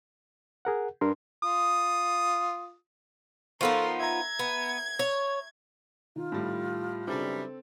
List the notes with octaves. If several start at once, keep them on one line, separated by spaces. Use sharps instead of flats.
G#4 A#4 F#5
G2 A#4 C6
F4 D#6
F3 B3 D#4 A4 A#4 F5 C6 C#6
E5 A#5 G#6
B3
C#5
D#3 F4
A2 G3
F#2 C#3 E3 G3 C4 D4 A4